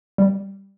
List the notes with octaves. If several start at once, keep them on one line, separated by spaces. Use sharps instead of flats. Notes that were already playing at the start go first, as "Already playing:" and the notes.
G3